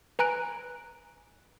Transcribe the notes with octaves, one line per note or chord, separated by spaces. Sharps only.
B4 G#5 A#5 F#6 D7